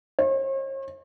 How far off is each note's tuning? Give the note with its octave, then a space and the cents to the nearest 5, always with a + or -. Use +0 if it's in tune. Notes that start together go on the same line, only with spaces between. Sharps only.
C#5 -45